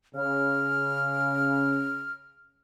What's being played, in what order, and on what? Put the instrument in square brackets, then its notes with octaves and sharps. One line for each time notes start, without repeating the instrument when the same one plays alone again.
[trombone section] C#3 [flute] F6